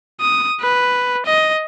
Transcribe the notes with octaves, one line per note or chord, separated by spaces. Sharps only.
D#6
B4
D#5